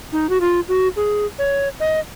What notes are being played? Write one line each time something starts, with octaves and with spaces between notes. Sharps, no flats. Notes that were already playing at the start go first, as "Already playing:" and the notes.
D#4
F#4
F4
F#4
G#4
C#5
D#5